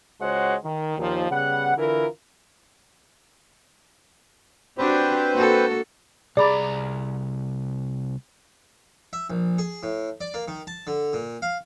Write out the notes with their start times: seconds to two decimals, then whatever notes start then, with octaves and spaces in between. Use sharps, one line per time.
0.21 C#2 G#3 F#4 C5 C#5 F#5
0.64 D#3
0.98 D#2 A#2 D#3 F3
1.30 C#3 G3 B3 F#5
1.77 D3 E3 E4 F4 A#4
4.78 C4 D4 F#4 G4 B4 C5
5.34 A#3 F#4 A4
6.37 C2 G#4 D5 A#5 B5 D6
9.13 E5
9.30 A#1
9.58 G#4
9.83 A2
10.21 D5
10.34 A#3
10.48 D#3
10.67 A5
10.87 D3
11.13 A#2
11.42 F5